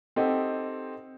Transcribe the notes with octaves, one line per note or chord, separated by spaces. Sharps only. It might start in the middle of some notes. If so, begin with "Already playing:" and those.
C4 D#4 G4 A4 D#5 F#5